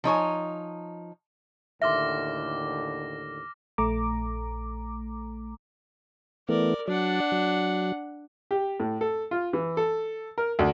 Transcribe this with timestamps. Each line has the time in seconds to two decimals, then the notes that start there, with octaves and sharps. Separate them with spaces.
0.04 F3 D#4 C#5 G#5
1.82 D#2 A2 D3 E5 C6 D6 F6 A#6
3.78 A#1 A3 A#5 D6
6.49 E3 A3 B3 A#4 D5
6.88 F#3 D4 D5 F#5
7.32 F#3
8.51 G4
8.80 A2
9.01 A4
9.31 F4
9.53 E3
9.77 A4
10.38 A#4
10.59 D2